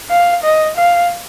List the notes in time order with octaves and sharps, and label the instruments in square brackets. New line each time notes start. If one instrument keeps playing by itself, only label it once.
[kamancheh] F5
D#5
F5